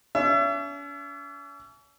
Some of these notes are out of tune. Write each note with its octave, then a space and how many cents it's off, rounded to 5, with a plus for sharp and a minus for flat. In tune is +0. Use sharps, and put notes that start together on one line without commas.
C#4 +45 E5 +35